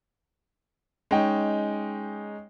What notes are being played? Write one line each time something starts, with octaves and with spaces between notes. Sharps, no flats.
G#3 C#4 D#4 G5